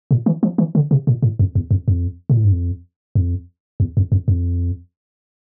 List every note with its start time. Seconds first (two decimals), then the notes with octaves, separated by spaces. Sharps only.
0.11 A#2
0.26 E3
0.43 F3
0.58 E3
0.75 D3
0.91 C3
1.07 A#2
1.23 A2
1.39 F2
1.55 E2
1.71 F2
1.88 F2
2.30 A#2
2.37 A2
2.44 G2
2.52 F2
3.15 F2
3.80 E2
3.97 F2
4.12 F2
4.28 F2